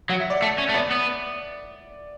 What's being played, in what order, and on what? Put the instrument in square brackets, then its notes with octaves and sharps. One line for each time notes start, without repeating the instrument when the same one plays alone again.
[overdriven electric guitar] F#3 [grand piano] F#5
[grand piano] E5
D5
[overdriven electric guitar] A3 [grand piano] E5
[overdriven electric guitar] C#4
A3
[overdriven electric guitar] B3 [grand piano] D5
[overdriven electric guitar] B3